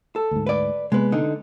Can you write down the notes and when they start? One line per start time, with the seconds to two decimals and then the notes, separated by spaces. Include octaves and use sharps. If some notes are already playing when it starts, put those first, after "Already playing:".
0.16 A4
0.31 D2 G#2
0.47 B4 D5
0.92 C3 G#3 A#3 B3 B4
1.12 D3 D#4